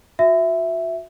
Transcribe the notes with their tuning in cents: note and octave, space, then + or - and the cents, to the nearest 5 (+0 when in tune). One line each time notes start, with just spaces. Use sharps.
F#4 -25 E5 +0